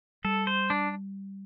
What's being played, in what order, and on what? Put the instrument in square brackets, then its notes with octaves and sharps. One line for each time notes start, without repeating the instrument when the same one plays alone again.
[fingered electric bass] G3 [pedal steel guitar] A4
[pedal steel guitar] C5
D4